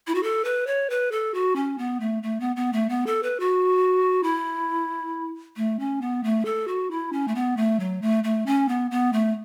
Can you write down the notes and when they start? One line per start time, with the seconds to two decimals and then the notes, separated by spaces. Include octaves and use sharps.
0.07 E4
0.15 F#4
0.23 A4
0.45 B4
0.67 C#5
0.90 B4
1.12 A4
1.34 F#4
1.56 C#4
1.78 B3
2.00 A3
2.23 A3
2.40 B3
2.56 B3
2.73 A3
2.89 B3
3.06 A4
3.23 B4
3.40 F#4
4.23 E4
5.57 A3
5.79 C#4
6.01 B3
6.24 A3
6.45 A4
6.68 F#4
6.91 E4
7.13 C#4
7.28 A3
7.35 B3
7.57 A3
7.80 F#3
8.02 A3
8.24 A3
8.46 C#4
8.69 B3
8.91 B3
9.13 A3